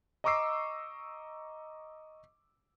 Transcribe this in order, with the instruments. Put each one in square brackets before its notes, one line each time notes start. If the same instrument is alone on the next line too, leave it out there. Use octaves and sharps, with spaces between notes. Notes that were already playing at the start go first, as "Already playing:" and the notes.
[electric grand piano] D#5 A#5 C#6 D6 E6 C7